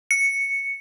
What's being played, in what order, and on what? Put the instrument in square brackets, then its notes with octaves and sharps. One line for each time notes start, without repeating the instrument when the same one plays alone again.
[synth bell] C#7